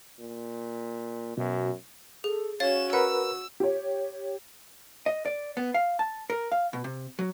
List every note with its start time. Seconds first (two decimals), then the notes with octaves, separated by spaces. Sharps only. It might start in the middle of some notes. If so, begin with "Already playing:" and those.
0.20 A#2
1.37 F#2 B2
2.24 G#4 A4
2.60 C#4 F#4 C#5 F5 A6 E7
2.93 A#4 B4 F#5 E6
3.60 G4 C#5
5.06 D#5
5.25 D5
5.57 B3
5.74 F5
5.99 A5
6.30 A#4
6.52 F5
6.73 B2
6.84 C3
7.19 F#3